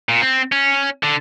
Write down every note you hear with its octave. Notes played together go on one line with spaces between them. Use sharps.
A#2
C4
C#4
D3